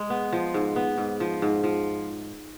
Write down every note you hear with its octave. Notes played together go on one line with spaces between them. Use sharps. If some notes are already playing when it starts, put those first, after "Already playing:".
Already playing: G#3
B3
F3
G#2
B3
G#2
F3
G#2
F3